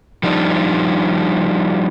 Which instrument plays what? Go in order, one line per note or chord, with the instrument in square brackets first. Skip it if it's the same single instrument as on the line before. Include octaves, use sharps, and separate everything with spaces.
[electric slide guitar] F3 G3 D4 D#4